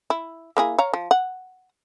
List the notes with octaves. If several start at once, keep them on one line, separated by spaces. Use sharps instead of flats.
E4
A#3 E4 G#4
C#5 F5 A#5
F3
F#5